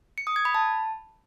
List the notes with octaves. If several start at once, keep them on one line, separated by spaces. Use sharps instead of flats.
C#7
D#6
G#6
B5
A5